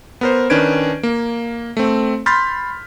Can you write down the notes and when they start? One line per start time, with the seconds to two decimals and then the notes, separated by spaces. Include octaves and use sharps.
0.21 B3 A#4 C5
0.50 D#3 C#4 D4 B4 G#6 D7
1.03 A#3
1.77 A3 C4
2.26 B5 C6 F6 G6 A6 B6